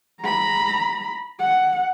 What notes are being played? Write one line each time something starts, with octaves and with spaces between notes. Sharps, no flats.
A#5 B5
F#5